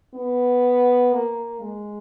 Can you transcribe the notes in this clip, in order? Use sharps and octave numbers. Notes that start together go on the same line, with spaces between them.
B3
A#3
G#3